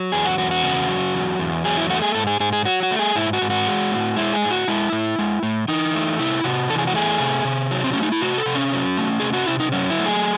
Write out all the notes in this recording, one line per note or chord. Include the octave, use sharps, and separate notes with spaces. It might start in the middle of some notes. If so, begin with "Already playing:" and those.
Already playing: F#3
E2 G#4
F#4
E2 F#4
F#4
C#3
F#3
E2
E2
F#3 G#4
E4
A3 F#4
G#4
G#2 A4
G#4
G#2 G#4
G#4
F#3 F#4
F#4
A3
G#4
G#2 E4
F#4
G#2
F#4
G#3
A2
G#3 E4
G#4
A2
F#4
G#3 E4
A2
G#3
A2
E3 D#4
A3
C3 E4
C3 F#4
E3 A4
G#4
F#4
A3 G#4
C3
C3
F#3
C4
A3 C#4
D#4
E4
C3 F#4
A4
C3
C#4
F#3
A3
C3 G#4
F#4
C3 E4
D#4
F#3 C#4
E4
A3
G#4